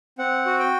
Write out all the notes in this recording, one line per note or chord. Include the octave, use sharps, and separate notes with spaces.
C4 F#5
F#4
G5